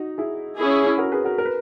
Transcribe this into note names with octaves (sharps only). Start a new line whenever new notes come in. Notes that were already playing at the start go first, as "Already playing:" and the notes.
Already playing: D#4 F#4
E4 G#4
C#4 E4 G#4
F#4 A#4
G#4 B4
F#4 A#4
A#4
B4